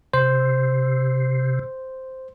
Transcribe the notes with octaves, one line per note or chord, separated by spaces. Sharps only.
C3 C5